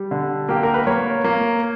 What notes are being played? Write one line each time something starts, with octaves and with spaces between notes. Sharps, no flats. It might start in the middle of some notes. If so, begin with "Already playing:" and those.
Already playing: G3
D3
A#3 G4
A#4
B4
A#3 C#5
A#3